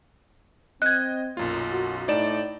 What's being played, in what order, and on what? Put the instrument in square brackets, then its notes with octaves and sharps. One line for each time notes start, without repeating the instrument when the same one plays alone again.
[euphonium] C4 [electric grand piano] D#5 [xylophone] F#6 G#6
[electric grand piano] B1 F#2 F4 [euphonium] A#2
[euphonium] F#4
[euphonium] A2 [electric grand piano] D#4 D5 E7